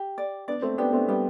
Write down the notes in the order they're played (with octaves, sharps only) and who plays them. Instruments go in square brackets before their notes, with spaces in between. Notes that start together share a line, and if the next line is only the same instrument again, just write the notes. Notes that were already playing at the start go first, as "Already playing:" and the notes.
Already playing: [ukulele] G4
D5
[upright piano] B3 D4 [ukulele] D5
[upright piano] A3 C4
[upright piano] B3 D4 [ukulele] G4
[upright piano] A3 C4
[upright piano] G3 B3 [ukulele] G4